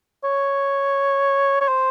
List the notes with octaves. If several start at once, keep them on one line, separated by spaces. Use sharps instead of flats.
C#5
C#5
C5